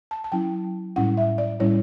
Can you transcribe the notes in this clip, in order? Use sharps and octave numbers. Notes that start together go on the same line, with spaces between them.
A5
A5
F#3 C#4 E4 G5
A2 G3 C#4 E4 F#5
E5
D5
A2 G3 C#4 E4 C#5